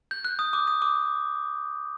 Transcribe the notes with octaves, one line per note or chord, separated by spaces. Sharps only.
G6
F#6
D#6
D6
D#6
D6